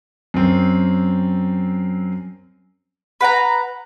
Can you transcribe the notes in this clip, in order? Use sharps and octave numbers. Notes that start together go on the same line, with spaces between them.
F#2 C4
B4 F#5 G5 A#5